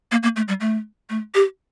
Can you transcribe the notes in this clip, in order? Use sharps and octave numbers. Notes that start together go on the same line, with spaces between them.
A#3
A#3
A3
G3
A3
A3
G4